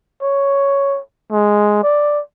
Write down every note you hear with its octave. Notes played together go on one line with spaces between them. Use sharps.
C#5
G#3
D5